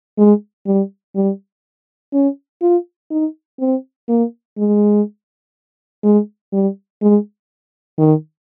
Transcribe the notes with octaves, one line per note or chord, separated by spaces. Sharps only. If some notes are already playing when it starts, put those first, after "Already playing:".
G#3
G3
G3
C#4
F4
D#4
C4
A#3
G#3
G#3
G3
G#3
D#3